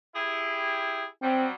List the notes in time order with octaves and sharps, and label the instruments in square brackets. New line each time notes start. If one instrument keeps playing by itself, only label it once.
[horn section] E4 G4 G#4
[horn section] F#3 G3 [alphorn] C4